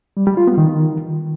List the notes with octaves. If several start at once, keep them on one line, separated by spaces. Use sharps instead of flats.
G3
G3
F4
B3
D#3